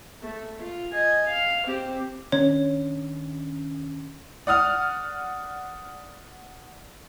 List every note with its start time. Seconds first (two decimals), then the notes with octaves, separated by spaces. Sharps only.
0.22 A3
0.62 F4
0.92 D#5 G#5
1.26 F5
1.65 C4 G4
2.32 D#3 C#4 D4 C#5
4.47 D5 F#5 D#6 F6